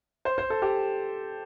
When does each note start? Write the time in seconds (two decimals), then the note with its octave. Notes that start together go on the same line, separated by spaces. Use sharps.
0.25 C5
0.38 C5
0.50 A4
0.62 G4